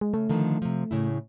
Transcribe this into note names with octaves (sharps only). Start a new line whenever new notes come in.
G#3
C#3 A3
D3 D#3 F3
C3 F3
A2 C#3 E4